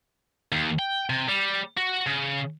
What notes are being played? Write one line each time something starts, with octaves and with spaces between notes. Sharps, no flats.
D#2
G5
C3
G3
F#4
C#3